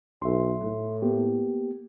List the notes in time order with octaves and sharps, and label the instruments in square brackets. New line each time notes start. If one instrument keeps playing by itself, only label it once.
[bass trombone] B1 [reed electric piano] E5 C6
[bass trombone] A2
[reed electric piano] A#3 B3 G4